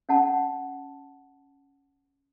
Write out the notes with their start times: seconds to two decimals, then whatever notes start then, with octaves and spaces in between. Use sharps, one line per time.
0.09 C#4 F#5 A5